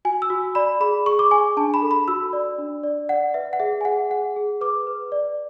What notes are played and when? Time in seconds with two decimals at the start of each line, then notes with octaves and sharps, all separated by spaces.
0.05 F#4 G#5
0.22 E6
0.30 F#4
0.55 D5 B5
0.80 G#4 B5
1.06 G#4 C#6
1.19 D6
1.31 G#4 G#5
1.57 D4 A5
1.74 B5
1.82 A4
1.91 B5
2.08 F#4 E6
2.33 D5
2.58 D4
2.83 D5
3.09 D5 F#5
3.34 B4 E5
3.53 F#5
3.60 G#4 E5
3.81 G#5
3.85 G#4 F#5
4.10 G#4 F#5
4.36 G#4
4.61 B4 D6
4.87 B4
5.12 D5